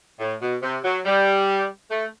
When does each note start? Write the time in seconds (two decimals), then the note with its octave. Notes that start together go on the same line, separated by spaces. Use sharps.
0.20 A2
0.42 B2
0.62 C3
0.84 F#3
1.06 G3
1.91 A3